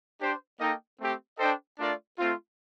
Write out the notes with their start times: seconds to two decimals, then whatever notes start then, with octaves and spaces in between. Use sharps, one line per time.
0.19 D4 G4 C5 G5
0.59 A#3 D#4 A4 D#5 G5
0.98 A3 C4 G4
1.38 D4 A4 C5 D#5 G5
1.78 A3 D4 F4 A#4 D5
2.18 A3 C4 F4